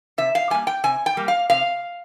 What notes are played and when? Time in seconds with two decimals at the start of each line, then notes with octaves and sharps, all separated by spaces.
0.18 C3 E5
0.35 F5
0.50 G3 A#3 G#5
0.67 G5
0.84 C3 G#5
1.06 G5
1.17 G3 A#3
1.28 F5
1.50 C3 F5